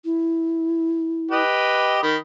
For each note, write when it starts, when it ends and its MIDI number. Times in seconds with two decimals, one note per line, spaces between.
0.04 1.41 64
1.31 1.99 67
1.31 1.99 71
1.31 1.99 75
2.03 2.16 51
2.03 2.16 83